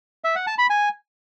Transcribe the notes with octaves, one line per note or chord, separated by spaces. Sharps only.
E5
F#5
A5
B5
G#5